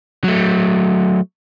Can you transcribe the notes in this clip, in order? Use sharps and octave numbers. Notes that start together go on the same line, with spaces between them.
F#3 A3